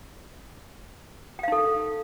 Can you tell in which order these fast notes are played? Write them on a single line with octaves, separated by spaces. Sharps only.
G5 F5 D#4 A4